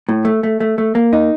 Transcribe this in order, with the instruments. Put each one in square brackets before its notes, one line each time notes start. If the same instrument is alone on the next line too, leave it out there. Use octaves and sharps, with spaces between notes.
[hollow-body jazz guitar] A2
A3
A3
A3
A3
A#3
D#4